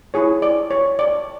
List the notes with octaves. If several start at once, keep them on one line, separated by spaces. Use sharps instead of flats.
E4 G#4 C#5
D5
C#5
D5